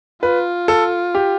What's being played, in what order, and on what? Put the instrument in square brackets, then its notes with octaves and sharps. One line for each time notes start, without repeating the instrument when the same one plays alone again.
[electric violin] F4 [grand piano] B4
[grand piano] A4
G4